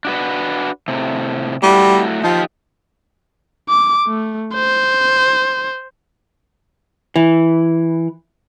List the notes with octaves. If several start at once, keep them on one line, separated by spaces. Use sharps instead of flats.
D4 F#4 B4
A2 C3
G3 A3 E4 F#4
F3 D#4 G4
D6
A3
C5
E3